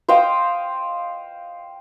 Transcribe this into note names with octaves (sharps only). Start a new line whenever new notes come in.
C5 D#5 F5 G5